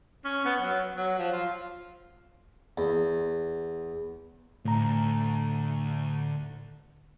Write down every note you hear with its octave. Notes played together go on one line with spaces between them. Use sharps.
C#4
B3
F#3
F#3
F3
F4
E2
D2 A2 A#5